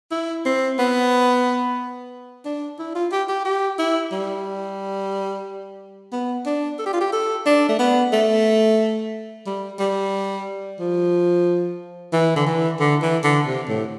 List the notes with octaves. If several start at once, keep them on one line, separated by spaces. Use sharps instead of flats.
E4
C4
B3
D4
E4
F4
G4
G4
G4
E4
G3
B3
D4
A4
G4
F4
G4
A4
D4
A3
B3
A3
G3
G3
F3
E3
D3
E3
D3
E3
D3
C3
A2